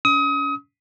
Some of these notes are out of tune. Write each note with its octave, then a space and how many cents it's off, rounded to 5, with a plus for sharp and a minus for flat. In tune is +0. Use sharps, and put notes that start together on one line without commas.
C#4 +30 D#6 +30